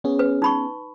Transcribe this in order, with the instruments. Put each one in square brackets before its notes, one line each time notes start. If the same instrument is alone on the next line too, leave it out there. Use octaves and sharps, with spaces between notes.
[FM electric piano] B3 C#4 G#4
[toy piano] B4
D#4 B5 C#6